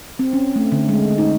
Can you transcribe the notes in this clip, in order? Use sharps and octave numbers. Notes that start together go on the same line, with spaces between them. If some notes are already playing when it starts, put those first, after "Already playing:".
C4
C#4
A3
D3
G#3
D#4